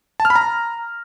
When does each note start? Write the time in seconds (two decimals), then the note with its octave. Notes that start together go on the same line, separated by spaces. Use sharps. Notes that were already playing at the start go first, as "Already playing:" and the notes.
0.20 A5
0.25 F6
0.30 B5
0.36 A#5